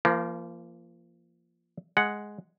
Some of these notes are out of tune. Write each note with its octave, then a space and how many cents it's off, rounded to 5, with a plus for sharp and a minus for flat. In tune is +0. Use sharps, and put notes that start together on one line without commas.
F3 -30 A#3 +0
G#3 +0 F#5 +0